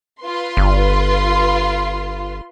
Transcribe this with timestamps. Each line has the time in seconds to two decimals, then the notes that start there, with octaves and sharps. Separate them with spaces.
0.21 F4 B4 C6
0.57 G1